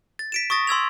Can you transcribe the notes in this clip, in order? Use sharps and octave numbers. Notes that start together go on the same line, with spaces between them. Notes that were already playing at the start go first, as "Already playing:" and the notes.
A6
B6 D7 E7
C#6 D#6 A6 A#6
C6 E6 G#6 F7